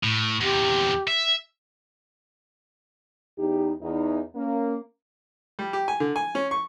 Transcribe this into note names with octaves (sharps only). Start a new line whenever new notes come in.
A2
E2 C3 G4
E5
E2 D#4 G4
E2 D#4
A#3 C#4
G3
G4
G#5
D3
G#5
C#4
C#6